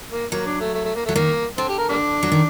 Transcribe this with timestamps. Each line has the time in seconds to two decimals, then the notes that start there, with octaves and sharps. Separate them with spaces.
0.11 A#3
0.32 F#3 A#3
0.46 D4
0.60 A3
0.74 A3
0.84 A3
0.95 A#3
1.06 A3
1.09 F#3
1.15 D#3 A#3
1.58 D3 C4
1.69 G4
1.78 A#4
1.89 G3 A#3 D4
2.23 F#3
2.32 D#3